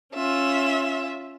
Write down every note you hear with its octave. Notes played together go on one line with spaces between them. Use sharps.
C#4 F4 E5